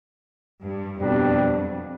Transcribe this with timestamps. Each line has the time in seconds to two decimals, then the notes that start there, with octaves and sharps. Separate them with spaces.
0.63 G2
0.98 F2 B2 G3 B3 D4 G4